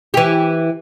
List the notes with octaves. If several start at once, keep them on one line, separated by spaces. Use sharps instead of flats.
E3 G4